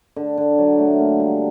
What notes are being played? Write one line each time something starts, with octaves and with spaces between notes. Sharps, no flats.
D3
D3
F#3
A3
A#3
G3